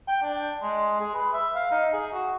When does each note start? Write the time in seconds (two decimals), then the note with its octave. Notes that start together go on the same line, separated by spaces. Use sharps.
0.08 G5
0.22 D4
0.62 G#3
1.00 G#4
1.14 B4
1.33 E5
1.55 F5
1.72 D#4
1.93 G#4
2.13 F#4